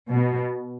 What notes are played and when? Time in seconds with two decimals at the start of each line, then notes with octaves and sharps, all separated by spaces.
0.11 B2